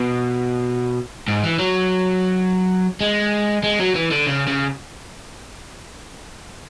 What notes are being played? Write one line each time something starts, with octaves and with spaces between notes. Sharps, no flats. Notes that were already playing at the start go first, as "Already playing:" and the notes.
Already playing: B2
G#2
E3
F#3
G#3
G#3
F#3
E3
D3
C#3
C#3